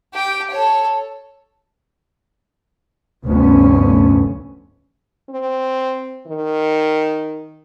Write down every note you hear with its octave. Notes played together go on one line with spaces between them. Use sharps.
G4 G5
A4 C#5
F1 D2 G2 B3 C#4
C4
D#3